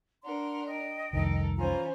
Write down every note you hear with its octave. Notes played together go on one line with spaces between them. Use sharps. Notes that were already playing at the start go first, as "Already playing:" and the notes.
D4 A#4 F#5 C6
D#5 G5
C2 F2 D#3 A4 A#4
E3 C#4 F4 C5 G#5 A#5